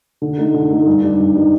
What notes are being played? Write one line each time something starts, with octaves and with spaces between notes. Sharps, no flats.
D3
A3 D#4 A4
D3
A3 D#4 A4
G2
D#3 G3 D4
G2
D#3 G3 D4